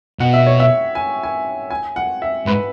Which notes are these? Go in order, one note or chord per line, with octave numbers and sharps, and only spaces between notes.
B2 F#5
E5
C#5
E5
G#5
G#5
G#5
F#5
E5
G#2 B4